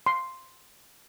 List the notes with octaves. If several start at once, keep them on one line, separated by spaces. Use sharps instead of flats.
C6